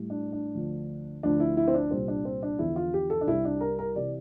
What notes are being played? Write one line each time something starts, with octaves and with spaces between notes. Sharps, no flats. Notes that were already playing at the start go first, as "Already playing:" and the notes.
Already playing: A2 G3
D4
D4
D2 D3 F3
D2 D3 F3 D4
E4
E4
C4
D4
C2 A#2 G3 C4
D4
C4
D4
E2 D3 F3 E4
F4
G4
A4
D4
C2 C3 G3 E4
D4
A#4
A#4
C3 E3 D5